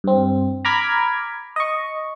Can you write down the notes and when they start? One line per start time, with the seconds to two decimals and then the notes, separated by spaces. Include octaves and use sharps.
0.04 G2 C4
0.65 A#5 B5 D6 F6 G#6 B6
1.56 D#5 C#6